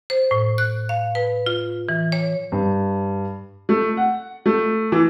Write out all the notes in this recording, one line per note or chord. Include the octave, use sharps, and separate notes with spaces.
C5
A2
F#6
F5
B4
F4
E3
C#5
G2
A3
F#5
A3
E3